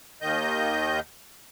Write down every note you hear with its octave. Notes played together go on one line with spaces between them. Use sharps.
D#2 D#3 D#5 G6